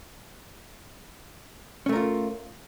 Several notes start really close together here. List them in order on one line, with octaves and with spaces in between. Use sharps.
C#4 A3 A#4 F4